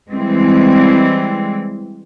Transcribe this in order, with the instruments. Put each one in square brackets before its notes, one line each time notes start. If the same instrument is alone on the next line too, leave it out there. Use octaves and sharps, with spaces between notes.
[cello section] E3 G3 G#3 C4